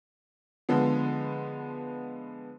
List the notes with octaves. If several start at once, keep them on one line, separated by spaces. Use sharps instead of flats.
D3 F3 G#3 B3